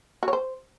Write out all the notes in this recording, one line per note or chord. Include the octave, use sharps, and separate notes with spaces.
F#4
C#5
C5